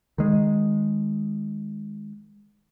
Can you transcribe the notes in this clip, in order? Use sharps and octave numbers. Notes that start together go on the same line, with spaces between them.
D#3 G#3